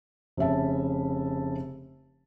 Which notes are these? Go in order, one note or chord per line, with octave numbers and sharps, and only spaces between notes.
F1 C#3 E5 A5